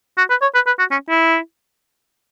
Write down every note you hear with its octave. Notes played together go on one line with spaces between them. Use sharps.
F#4
B4
C#5
B4
B4
F#4
C#4
E4